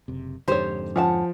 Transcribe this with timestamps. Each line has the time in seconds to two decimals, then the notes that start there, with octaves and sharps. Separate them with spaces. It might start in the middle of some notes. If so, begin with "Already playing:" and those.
0.08 F#1 C3
0.48 F2 G#2 D3 D#4 G4 C5 C#5
0.96 F3 C#4 F#5 A5